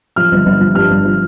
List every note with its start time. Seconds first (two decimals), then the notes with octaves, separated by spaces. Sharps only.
0.16 F3 F6
0.32 G1
0.46 G1
0.61 F3
0.75 G2 F6
0.90 G1
1.05 F3